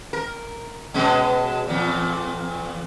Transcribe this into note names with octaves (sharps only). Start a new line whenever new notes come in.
A#4
B2 G#3 C#4
E2 A#2